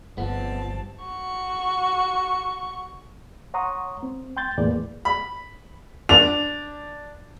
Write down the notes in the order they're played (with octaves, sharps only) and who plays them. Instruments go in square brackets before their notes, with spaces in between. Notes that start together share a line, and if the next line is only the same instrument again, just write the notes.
[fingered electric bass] G1 [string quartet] G2 C4 A5 [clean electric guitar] F3 B3
[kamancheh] F#4 C#6
[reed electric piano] C#5 F#5 A#5 C6 C#6 D#6
C4
G5 C6 G6 A6
E2 A2 A#3 G#4 B4 D5
[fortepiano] B5
[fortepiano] D4 [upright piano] F7